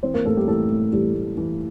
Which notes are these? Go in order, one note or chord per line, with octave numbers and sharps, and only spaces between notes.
E3 C4 C5
A#3 A#4
A2 A3 A4
G3 G4
E3 A3 A4
A2
E3 G3 G4
A2
E3